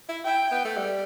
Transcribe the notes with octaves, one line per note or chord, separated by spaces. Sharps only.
E4
E4 G5
B3
A3
G3